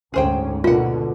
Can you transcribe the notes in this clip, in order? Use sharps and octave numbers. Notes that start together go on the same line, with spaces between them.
D2 G#2 C#4 G#4 C5 G5
B2 D3 A#3 F4 F#5